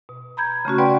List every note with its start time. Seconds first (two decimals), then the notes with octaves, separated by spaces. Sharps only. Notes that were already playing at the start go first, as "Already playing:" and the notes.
0.09 B2
0.37 A#5 B5 G6 G#6
0.65 C#3 A3 C#4 F#4
0.78 B4 D5 F#5 G5 B5 C6